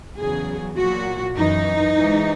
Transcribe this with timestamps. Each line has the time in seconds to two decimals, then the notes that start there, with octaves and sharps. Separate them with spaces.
0.19 E2 C#3 F#3 G#4
0.77 A#2 F#3 F#4
1.36 F#2 E3 D#4
1.97 G#2 E3